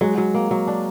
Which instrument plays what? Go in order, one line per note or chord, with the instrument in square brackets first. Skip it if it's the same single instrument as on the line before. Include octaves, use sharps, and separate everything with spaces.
[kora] F#3 [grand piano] G#3
[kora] F#3
A#3
F#3
D4